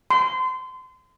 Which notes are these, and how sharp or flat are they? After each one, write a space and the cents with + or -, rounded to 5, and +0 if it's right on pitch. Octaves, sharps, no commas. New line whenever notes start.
C6 -30